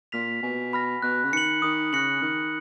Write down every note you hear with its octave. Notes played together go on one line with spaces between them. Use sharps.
A#2 F6 B6 F7
B2 G#5
B5 F6 A#6
B2 F#6
C#3
D#3 C#7 F#7
D#3 D#6
C#3 F#6 A#6 C#7 F#7
D#3 F6